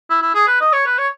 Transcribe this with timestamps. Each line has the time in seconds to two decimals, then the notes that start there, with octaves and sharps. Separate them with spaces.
0.10 E4
0.22 E4
0.34 G#4
0.47 B4
0.61 D#5
0.73 C#5
0.86 B4
0.99 C#5